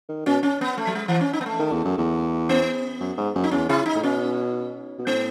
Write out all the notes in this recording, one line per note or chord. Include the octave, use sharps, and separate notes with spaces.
D#3
B2 C#4
C#4
B3
A3
F#3
G#3
E3
C#4
D#4
B3
A3
D#3
E2
F#2
E2
B3
F#2
G#2
F#2
D#4
E2 C#4
C#3 E4
D#4
A2
B2 C#4
B2
A2 B3